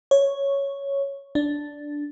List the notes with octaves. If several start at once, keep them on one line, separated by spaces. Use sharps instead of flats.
C#5
D4